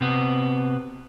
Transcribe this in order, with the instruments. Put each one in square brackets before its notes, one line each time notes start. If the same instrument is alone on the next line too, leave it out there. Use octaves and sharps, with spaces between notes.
[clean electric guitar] C3 B3